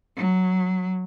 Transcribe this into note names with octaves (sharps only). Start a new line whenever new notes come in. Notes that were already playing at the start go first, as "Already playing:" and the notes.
F#3